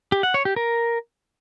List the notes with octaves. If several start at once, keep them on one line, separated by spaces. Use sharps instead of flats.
G4
F#5
C#5
G4
A#4